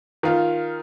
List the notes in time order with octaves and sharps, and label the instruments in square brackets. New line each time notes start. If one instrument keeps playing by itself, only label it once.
[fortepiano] D#3 F4